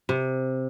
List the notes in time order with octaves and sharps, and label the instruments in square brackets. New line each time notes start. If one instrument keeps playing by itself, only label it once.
[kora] C3